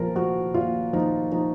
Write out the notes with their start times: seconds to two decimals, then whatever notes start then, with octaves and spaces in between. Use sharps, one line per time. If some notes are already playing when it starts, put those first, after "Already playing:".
Already playing: A#2 F3 A#4
0.16 F3 F#4
0.54 A#2 F4
0.93 F3 D#4
1.32 F3 D#4